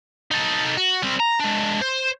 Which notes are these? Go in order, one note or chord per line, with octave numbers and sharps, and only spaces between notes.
D#4 A4
F#4
G3 C4
A#5
G#3 D4
C5